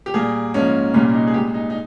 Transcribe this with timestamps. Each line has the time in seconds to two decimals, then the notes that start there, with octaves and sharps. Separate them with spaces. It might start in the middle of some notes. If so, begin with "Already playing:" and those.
0.06 G4
0.14 A#2 G3 A#3 G#4
0.54 G#2 F3 A#3 C#4
0.94 C2 A#2 G3 A#3 C#4
1.14 D#4
1.27 G#4
1.34 A#2 G#3 G4
1.54 D#4
1.70 D#4